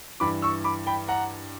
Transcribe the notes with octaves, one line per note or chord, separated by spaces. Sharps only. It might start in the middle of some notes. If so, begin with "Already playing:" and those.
G2 E3 B5 D6
C#6 E6
B5 D6
G5 B5
F#5 A#5